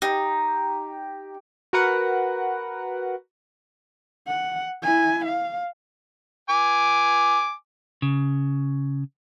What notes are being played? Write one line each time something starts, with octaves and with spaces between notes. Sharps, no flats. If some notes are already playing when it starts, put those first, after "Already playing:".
D#4 G4
F#4 A#4 B4 F#5
F#5
E4 G#5
F5
G#5 D6
C#3